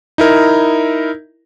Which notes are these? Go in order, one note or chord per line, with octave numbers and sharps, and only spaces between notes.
D#4 E4 A#4